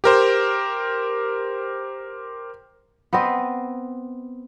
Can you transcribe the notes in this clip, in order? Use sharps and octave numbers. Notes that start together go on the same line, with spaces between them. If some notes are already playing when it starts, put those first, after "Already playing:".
G4 A#4 C5
B3 C4 C5 D#5